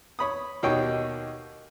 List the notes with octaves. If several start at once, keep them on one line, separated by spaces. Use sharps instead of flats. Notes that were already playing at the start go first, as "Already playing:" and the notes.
C#5 B5 D#6
D#2 B2 A#3 D#4 C#5 G5